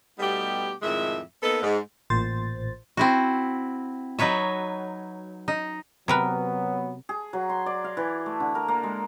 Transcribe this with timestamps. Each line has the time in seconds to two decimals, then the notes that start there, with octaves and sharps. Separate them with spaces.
0.18 B2 G3 A3 B3 D#4 G4
0.82 F2 A2 D#3 G#3 E5
1.42 A#3 B3 D#4 A4
1.62 G#2
2.10 A1 A#2 C5 A6
2.97 C4 E4 F#4
4.19 F#3 D#4 B4 C#5 E5
5.48 D#4
6.08 C3 F#3 B3 A#4 B4
7.09 G#4
7.33 F#3
7.49 C6
7.66 D5
7.84 F5
7.97 E3
8.26 A3
8.40 D3
8.55 A#4
8.68 A#3
8.83 G#3